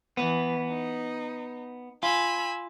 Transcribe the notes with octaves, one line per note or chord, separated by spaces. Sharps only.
E3 B3
D#4
F4 G#5 B5 E6